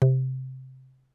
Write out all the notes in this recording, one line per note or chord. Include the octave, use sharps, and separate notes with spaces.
C3